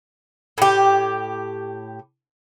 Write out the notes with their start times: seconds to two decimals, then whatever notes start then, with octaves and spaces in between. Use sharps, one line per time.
0.58 A2 G4